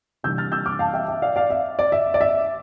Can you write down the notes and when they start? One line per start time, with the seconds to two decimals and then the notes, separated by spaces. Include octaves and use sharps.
0.23 C3 E3 G3 A#3 D4 E6 G6
0.38 F6 A6
0.52 E6 G6
0.66 D6 F6
0.79 F5 A5
0.93 E5 G5
1.08 E5
1.22 D5 F5
1.36 D5 F5
1.50 E5
1.79 D5
1.92 E5
2.14 D5
2.21 E5